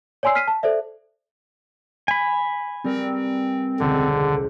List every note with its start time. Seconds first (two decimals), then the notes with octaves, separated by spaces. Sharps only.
0.23 C#5 D5 G#5 C6 E6 C7
0.35 F6 B6 C7 D#7
0.48 A5
0.63 A4 C5 D5 E5
2.08 G#5 B5
2.84 G3 C4 A#4 B4
3.80 E1 C#2 D3 C5